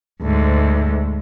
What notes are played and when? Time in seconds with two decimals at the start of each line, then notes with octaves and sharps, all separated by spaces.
0.22 D2 G#2